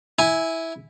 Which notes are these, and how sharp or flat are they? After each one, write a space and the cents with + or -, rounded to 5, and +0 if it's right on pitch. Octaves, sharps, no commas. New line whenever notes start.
E4 -10 G#5 +0